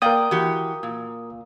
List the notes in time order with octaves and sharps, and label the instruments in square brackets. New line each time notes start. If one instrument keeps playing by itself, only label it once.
[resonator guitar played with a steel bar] A#3 D5 G5 [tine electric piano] A#4 F5 D#6
[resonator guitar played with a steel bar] E3 F#4 G4
A#2